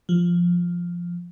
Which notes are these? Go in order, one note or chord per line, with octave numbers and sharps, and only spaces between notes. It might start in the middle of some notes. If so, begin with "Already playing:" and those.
F3